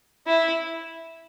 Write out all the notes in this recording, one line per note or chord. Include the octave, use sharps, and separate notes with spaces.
E4